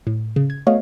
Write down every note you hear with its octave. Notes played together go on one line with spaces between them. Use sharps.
A2
C#3
G#6
A3 B3 F#4 C#5 D#5 F5